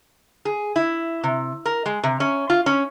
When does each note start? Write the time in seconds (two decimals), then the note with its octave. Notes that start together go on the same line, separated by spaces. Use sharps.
0.45 G#4
0.76 E4
1.24 C3
1.66 A#4
1.86 G#3
2.03 C3
2.20 C#4
2.50 F4
2.66 C#4